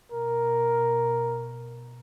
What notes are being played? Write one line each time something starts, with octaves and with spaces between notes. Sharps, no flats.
B2 A#4